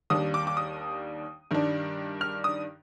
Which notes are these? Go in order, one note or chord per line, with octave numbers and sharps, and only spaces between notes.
D#2 D#3 G3 D4 D#6
D6
D6
D#6
G2 D#3 G3 D4
F6
D#6